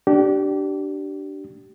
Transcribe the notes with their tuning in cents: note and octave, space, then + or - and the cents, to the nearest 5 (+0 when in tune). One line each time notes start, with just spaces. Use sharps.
D4 +0 G4 -30